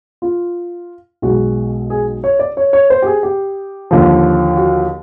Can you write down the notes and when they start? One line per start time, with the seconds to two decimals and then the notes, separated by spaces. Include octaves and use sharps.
0.22 F4
1.22 B1 B2 G#3 F#4
1.90 G#4
2.24 C#5
2.39 D5
2.57 C#5
2.73 C#5
2.90 C5
3.02 G4
3.06 G#4
3.23 G4
3.91 D#2 D3 F3
4.56 F#4